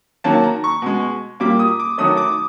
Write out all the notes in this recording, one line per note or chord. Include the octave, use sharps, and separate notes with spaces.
D#3 F#3 A#3 A5
A#5
C#6
B2 G#3
A#2 G3 A#3 D6
D#6
D6
D#3 F#3 A3 D#6
D6